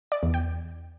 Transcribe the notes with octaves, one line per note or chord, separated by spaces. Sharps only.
D5
E2
G5